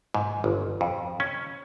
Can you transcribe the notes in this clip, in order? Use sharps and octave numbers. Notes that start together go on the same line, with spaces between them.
G#2
G1
F2
C#4